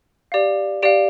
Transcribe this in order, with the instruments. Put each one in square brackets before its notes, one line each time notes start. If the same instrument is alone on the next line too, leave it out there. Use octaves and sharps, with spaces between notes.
[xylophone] G4 D5 F5
G4 D5 F5 D7